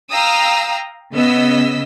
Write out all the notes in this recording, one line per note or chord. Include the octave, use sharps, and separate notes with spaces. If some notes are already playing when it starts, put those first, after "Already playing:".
F5 G5 A#5 D#6 E6
C#3 B3 D#5 E6 B6